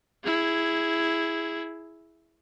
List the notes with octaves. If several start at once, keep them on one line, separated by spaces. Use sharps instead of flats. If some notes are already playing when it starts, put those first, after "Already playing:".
E4 G#4